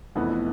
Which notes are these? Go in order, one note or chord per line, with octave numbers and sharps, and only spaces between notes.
F1 F2 E3 B3 E4